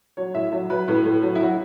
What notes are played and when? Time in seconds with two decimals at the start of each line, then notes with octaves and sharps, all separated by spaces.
0.17 F#3 C#5
0.34 A2 E5
0.52 F#3 E5
0.70 F#3 B4
0.88 A2 B4
1.05 A2
1.22 F#3
1.35 E4
1.40 F#3 F#4